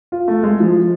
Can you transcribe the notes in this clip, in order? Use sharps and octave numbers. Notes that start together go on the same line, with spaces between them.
F4
A3
G#3
F3